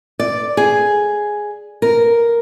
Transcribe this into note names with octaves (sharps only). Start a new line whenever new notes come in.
D5
G#4
A#4